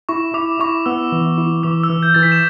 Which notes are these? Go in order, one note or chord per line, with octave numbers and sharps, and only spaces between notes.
E4 C#6
E4 D6
E4 C#6
B3 E6
E3
E4
E3 D6
E6
E3
G6
E3 A6
B6
E7